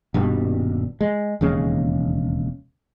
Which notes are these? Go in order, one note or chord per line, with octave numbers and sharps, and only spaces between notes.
D#1 G2 B2 G3
G#3
E1 D#2 C#3 G#3